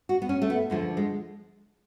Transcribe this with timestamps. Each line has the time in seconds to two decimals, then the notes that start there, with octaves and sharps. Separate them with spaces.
0.09 F#4
0.22 B3
0.29 C#4
0.42 A3
0.50 B3
0.70 D2 D3 F3 G#3
0.97 G#3